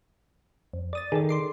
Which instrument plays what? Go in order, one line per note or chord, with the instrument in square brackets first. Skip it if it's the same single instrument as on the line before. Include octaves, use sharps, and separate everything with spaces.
[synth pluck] F2
D5 D#6 A6
[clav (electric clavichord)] D#3 [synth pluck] G#4 A4 D5
[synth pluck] C6 D6 C7